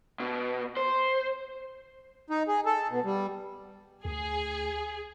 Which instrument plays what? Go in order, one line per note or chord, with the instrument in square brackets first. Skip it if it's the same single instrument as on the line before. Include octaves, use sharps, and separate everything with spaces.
[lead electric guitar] B2
C5
[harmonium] D#4
G#4
A4
B2
G3
[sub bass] D2 [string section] G#4